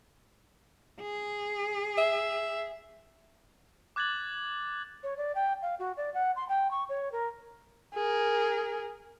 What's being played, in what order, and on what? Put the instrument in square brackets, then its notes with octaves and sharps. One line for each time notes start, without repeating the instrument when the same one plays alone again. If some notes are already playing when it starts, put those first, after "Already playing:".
[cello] G#4
[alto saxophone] E5
[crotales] D6 F#6 G#6 A6 F#7
[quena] C#5
D5
G5
F5
F#4
D5
F#5
C6
G5
C#6
C#5
A#4
[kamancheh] G#4 A#4